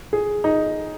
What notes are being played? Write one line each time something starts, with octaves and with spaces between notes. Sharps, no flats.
G#4
D#4